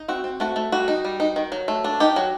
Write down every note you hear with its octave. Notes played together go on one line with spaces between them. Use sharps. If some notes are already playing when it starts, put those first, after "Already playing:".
Already playing: D#4
C4 F#4
C4
A3 F#4
A3
G3 F#4
D#4
G3
D#4
D#3
F#3
A3
D4
D#4 G4
F#3